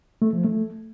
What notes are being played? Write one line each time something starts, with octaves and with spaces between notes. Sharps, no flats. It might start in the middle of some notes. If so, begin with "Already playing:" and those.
A3
F3
A3